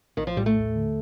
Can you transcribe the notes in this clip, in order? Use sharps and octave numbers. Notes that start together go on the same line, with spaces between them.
A#1 D#3
F3
A2 G3
A3
D#2
D3